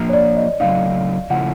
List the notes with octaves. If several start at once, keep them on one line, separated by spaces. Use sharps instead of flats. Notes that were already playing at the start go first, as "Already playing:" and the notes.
Already playing: F3 A#3 D4
C#5
D5
D#5
C#3 F#3 A3 C4 D#4 F5
C#3 F3 A3 C#4 E4 F#5